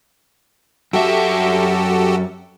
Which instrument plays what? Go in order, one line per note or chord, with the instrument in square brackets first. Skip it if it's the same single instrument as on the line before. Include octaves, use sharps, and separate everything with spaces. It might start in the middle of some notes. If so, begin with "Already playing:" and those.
[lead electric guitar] F#2 E5 [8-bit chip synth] F#4 G4 A4